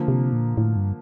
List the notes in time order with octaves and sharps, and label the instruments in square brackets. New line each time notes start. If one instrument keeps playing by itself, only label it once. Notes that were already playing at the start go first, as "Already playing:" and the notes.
Already playing: [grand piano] D3 F3 A#3
[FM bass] C3
A#2
A2
G2